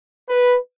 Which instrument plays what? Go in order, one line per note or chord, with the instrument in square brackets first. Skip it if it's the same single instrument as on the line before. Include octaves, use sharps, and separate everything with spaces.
[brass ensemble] B4